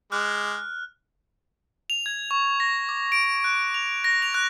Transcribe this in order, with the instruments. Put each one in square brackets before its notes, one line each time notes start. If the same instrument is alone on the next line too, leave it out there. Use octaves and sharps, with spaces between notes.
[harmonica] G#3 D6 [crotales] F6 F#6
[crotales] F7
G#6
C#6
A#6
D6
D7
F#6
F7
A#6
F7
F#6